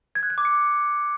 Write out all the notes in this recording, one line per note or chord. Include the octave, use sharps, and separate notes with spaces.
G#6
F#6
G#6
D6
C#7